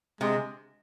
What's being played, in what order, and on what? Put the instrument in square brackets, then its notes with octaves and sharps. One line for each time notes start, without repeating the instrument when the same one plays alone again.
[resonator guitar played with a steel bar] C3 [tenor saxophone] G#3